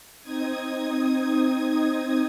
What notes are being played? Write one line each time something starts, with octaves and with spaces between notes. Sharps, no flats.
C4 D#4 D#6 G#6